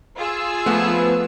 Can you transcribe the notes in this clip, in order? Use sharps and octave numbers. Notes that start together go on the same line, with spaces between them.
F4 G#4 E6
F3 A3 B3